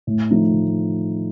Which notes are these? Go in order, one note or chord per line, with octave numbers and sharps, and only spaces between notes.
A2
F3 A3 D#4
A2